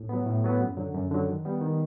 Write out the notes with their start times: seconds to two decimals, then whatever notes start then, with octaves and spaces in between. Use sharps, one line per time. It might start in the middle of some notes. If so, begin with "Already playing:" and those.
Already playing: A2
0.09 F#3 B3
0.26 A2
0.44 F#3 B3
0.61 F#2
0.77 D3 F#3
0.94 F#2
1.11 D3 F#3
1.28 D#3
1.45 G3 B3
1.61 D#3